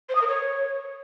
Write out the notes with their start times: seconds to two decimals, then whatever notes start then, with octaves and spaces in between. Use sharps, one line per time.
0.09 C5
0.15 D#6
0.21 A#4
0.27 C#5